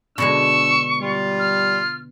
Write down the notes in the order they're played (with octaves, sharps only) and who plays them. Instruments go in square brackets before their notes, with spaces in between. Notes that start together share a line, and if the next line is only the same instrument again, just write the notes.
[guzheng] B2 D3 G#3 [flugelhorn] D4 [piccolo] C#6 [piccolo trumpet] E6
[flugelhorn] G3 [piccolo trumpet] F4
[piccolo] F6